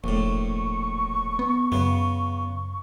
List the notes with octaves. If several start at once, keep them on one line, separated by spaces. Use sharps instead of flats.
E1 A#1 A2 C#6
B3
F#2 C#3 B3